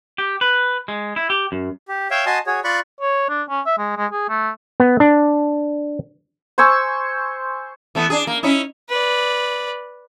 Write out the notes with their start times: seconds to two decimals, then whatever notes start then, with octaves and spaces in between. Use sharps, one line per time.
0.18 G4
0.41 B4
0.88 G#3
1.16 E4
1.30 G4
1.52 F#2
1.88 G4
2.11 C#5 E5 F5 G5
2.26 F#4 D#5 G#5 A5 C6 D#6
2.46 F#4 G#4 C#5
2.64 F4 D5 B5 C#6 F#6
3.01 C#5
3.29 D4
3.49 C#4
3.66 E5
3.78 G#3
3.97 G#3
4.11 G#4
4.29 A3
4.80 B3
5.00 D4
6.58 C5 G#5 C#6 E6
7.95 E3 A3 B3
8.10 D4 G#4
8.27 A#3
8.43 C#4 D#4 E4
8.89 B4 D5